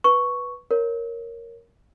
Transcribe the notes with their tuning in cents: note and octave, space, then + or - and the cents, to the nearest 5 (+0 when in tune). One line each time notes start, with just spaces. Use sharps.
B4 -5 C#6 +0
A#4 +0 C#5 +0